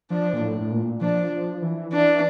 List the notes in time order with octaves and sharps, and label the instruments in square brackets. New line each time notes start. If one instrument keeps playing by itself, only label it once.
[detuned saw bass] F3 [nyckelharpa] D4
[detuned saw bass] A#2
A2
A2
A#2
[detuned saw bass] F3 [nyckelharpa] D4
[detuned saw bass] F3
E3
[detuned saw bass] E3 [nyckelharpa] D4